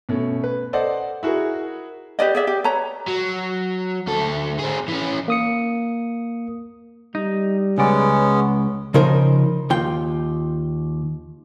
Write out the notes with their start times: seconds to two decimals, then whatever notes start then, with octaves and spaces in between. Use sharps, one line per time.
0.09 B2 A3 C#4
0.44 B4
0.73 A4 C5 D5 D#5 F#5
1.23 E4 F#4 G#4 A#4
2.19 G4 B4 D5 D#5
2.35 G#4 D5 E5
2.47 G4
2.64 B4 C#5 A#5
3.08 F#3
4.08 D2 A4
4.59 C4 G#4
4.88 E3 C#4
5.28 A#3 D#6 C#7
7.15 G3 D#4
7.78 C#2 G#3 B3 C#4 D5
8.94 C#3 F3 D#4 A#4 C5
9.70 D#2 F4 G5